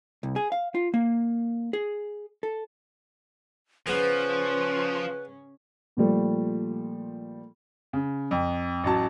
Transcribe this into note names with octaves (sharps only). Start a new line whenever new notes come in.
C2
G#4
F5
F4
A#3
G#4
A4
C#3 F3 B3 C#4 G#4 B4
A#2 F3 G3 A3
C#3
F2
A1 F#3 A5